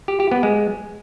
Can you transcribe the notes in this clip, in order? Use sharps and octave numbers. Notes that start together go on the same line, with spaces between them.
G4
G4
B3
G#3